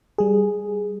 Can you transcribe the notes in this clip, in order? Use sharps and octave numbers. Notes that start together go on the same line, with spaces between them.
G3 G#4